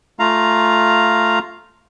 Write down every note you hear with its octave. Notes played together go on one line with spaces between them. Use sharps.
A3 F4 F5 A#5